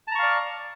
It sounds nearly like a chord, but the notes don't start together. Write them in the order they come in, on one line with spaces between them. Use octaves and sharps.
A5 A#5 C#6 F5 D5